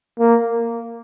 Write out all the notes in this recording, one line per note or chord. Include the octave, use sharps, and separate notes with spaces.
A#3